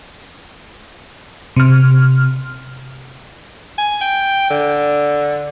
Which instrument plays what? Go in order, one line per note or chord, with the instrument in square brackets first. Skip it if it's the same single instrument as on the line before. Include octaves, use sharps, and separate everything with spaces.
[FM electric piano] C3 F6
[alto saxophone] G#5
G5
D3